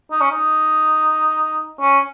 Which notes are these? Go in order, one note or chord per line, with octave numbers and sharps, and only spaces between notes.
D#4
C#4
D#4
C#4